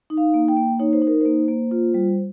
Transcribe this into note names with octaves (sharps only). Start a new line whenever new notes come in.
D#4
F5
A#3
G5
A#3
D#4 C#5
C5
D#4
A#4
A#3 C5
A#3
F4
G3